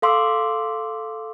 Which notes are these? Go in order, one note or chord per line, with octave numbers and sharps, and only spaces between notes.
A4 F5 C6 D6 E6